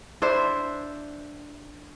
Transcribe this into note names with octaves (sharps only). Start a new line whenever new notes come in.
D4 E4 C5